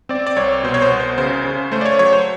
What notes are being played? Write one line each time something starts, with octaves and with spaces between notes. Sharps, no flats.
C4 D5
D5
C2 C#5
B2 C5
C#5
C5
C2
C5
C#3 C5
C#3
A3 C5
D5
C#5
F#3 C#5
C5